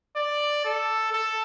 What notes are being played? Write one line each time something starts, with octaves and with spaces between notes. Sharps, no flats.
D5
A4
A4